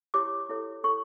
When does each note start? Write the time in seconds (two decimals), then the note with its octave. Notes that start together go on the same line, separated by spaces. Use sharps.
0.14 E4 G4 C#5 D6
0.49 E4 A4 C#5
0.84 E4 A4 C#5 C#6